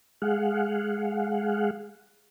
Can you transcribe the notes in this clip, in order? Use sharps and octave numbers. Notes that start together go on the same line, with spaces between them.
G#3 G#4 F5 F#5